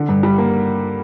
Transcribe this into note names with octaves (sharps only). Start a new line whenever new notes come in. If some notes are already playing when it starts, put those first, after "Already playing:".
Already playing: D3
G2
G3
A#3